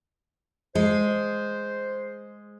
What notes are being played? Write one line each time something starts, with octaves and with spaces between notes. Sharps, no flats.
G#3 C5